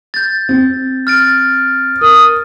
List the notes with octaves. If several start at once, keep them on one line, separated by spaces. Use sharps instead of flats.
G6 A6
C4
F6 A6 D7
A#4 D#6